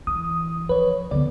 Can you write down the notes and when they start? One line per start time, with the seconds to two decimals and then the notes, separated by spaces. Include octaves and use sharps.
0.07 E3 D#6
0.69 F3 B4 C#5
1.11 D3 B3 D5